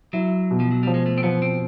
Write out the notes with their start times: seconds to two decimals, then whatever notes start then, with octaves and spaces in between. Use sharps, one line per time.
0.13 F#3 E4
0.51 B2
0.60 F3
0.71 F#3
0.83 F3 G3
0.94 G#3
1.06 A3
1.18 C4
1.23 F3 B3
1.42 C4